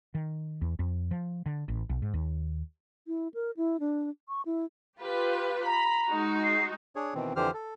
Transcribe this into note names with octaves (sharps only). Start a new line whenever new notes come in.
D#3
E2
F2
F3
D3
A1
B1
G#2
D#2
E4
A#4
E4
D4
C#6
E4
F4 G4 B4
A#5 B5
G#3 D#4 F#4
C7
D4 G#4 C#5
B2 D#3 E3 C4
F2 D3 E3 G4 C5 F6
A4